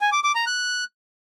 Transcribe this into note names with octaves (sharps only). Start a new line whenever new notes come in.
G#5
D6
D6
A#5
F#6